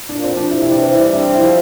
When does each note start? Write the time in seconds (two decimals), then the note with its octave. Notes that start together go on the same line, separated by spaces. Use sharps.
0.09 A#2 D4
0.24 C4
0.31 F3
0.37 D4
0.51 C3 E4
0.62 E4
0.71 E3 D4
0.82 C4
0.92 G3 E4
1.13 C4 D4
1.34 F3 E4